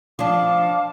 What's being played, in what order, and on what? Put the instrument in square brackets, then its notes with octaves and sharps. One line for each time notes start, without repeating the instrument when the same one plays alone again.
[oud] F3 D4 [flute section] F5 A5 D6